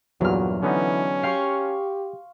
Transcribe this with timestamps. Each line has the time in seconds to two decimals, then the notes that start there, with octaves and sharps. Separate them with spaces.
0.21 E2 G2 A#2 F#3 F#4 F6
0.63 D3 E3 B3 C#4 D#4
1.23 G4 F5 G5 C6 C#6